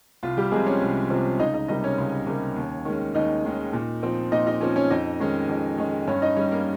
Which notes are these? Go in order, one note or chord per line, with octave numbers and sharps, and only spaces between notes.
C2 F4
G3 G4
C3 F3 G#3 C4 G#4
C#4 C#5
C2
C3 F3 C4
C#2 D#4 D#5
D#4 D#5
C3 G3 A#3 D#4 D#5
C#4 C#5
C#2
C3 G3 A#3
D#2
D#3 G#3 C#4
D#2 D#4 D#5
D#3 G#3 C#4
A#2
F3 C4
A#2 D#4 D#5
D#4 D#5
F3 C4 C#4 C#5
C#4 C#5
F2 D#4 D#5
D#3 G#3 C#4
F2
D#3 G#3 C#4
G2 C#4 C#5
D#4 D#5
G3 C#4 C#5
A#3 A#4